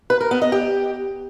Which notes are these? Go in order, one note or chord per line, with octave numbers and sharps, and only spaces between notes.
B4
A#4
B3
D#5
G4